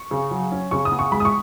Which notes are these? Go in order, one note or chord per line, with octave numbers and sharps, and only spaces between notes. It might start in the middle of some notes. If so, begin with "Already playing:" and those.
Already playing: C#6
C#3
F#3
C#4
C#3 C#6
D#6
B3
C#6
G#3 B5
D#6
C#6